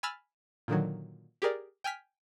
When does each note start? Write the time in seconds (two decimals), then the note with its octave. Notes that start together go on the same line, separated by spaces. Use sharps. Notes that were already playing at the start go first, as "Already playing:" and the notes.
0.03 G#5 B5 E6 F6 A6
0.68 A#2 D3 D#3 F#3
1.42 G4 G#4 A#4 D5
1.84 G5 G#5 F6 B6